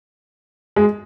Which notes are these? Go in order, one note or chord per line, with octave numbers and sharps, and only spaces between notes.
G#3